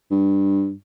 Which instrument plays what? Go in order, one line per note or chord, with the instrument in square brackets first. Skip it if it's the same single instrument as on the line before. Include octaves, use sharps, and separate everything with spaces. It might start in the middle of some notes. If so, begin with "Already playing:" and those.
[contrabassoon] G2